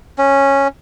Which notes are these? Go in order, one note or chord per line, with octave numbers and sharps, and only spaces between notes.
C#4